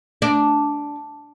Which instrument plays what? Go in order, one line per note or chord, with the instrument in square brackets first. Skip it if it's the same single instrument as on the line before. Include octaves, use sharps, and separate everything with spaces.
[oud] D4